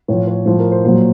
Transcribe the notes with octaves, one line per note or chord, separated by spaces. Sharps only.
A2 F3 C#5
C#5
A2 F3 C5
A#4
C5
A#2 F#3 C5